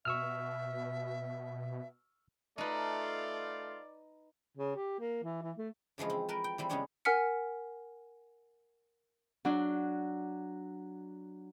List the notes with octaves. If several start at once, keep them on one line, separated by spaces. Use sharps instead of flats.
B2 E5 C#6 E6 F6
A3 D#4 F4 B4 D5
C#3
G4
A#3
E3
E3
A3
C#3 E3 F3 G#3 C#4
C4
A#4 B4 G5 A5
G5
E3 G3 C4
C#3 G#3 B3 C#4 D4 C#5
A#4 F#5 G#5 F6 B6 C#7
F#3 D4